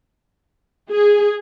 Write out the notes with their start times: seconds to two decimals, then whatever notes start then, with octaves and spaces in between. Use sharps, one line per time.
0.90 G#4